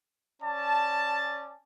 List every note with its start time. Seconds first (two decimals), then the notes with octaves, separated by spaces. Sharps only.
0.42 C#4 D5 A5